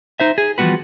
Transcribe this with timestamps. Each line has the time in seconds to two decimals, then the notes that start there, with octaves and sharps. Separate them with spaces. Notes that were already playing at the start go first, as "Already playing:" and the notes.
0.20 D#4 C5 E5
0.38 G#4
0.58 E3 F3 G3 B3 F#4 B4